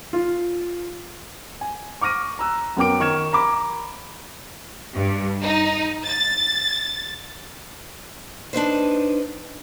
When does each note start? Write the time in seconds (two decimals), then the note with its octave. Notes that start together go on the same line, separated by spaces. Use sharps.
0.13 F4
1.61 G#5
2.01 C#6 D6 F6 A#6 D#7
2.39 A#5 E6 F#6
2.77 F#2 B3 A#4 G5 D6 D7
3.00 D#3 C#6 F6 G#6 E7
3.33 A#5 B5 D6
4.94 G2
5.43 D#4
6.07 A6
8.53 D4 D#4 B4 C5